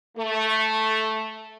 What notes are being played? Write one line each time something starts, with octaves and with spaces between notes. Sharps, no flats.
A3